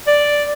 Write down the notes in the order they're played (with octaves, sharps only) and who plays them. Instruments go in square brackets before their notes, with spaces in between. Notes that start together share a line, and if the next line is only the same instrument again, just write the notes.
[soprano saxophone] D5